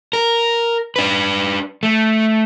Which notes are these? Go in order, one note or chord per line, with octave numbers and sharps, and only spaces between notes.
A#4
D4 B4
A3